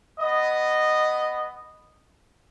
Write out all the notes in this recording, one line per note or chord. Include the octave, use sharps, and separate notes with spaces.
B3 D#5